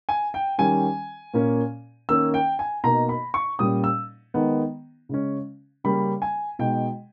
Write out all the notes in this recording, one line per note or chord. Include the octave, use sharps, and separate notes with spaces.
G#5
G5
D#3 G3 C#4 G#5
A#2 A#3 C#4
D#3 A#3 C#4 E6
G5
G#5
B2 A#3 D#4 A#5
B5
C#6
A#2 G3 A#3 C#4 D#6
E6
D#3 G#3 B3 D#4
C#3 G#3 C#4
C#3 G3 A#3 C#4 B5
G#5
B2 G#3 D#4 G5